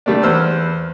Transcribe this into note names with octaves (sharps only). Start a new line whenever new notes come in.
D#3 G3 A3 A#3 D4
E2 B4 C5 E6 F6